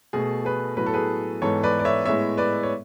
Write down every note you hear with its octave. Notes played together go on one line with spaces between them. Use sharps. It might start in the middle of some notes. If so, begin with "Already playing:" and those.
B2 A3 G#4
G#4 B4
A2 F#3 B3 B4
A4
G#4 B4
G#2 E3 B3 A4 C#5
B4 D5
D5
C#5 E5
A2 G#3 B3 C#5 E5
B4 D5
C#5